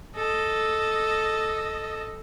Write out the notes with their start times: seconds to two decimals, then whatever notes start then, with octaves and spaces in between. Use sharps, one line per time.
0.16 A4 D#5